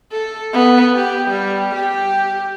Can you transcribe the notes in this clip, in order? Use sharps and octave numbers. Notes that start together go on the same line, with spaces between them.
A4
B3
G4
G3
G4